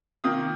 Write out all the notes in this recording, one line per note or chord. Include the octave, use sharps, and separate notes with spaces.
C3 D#3 A#3 F4 D#6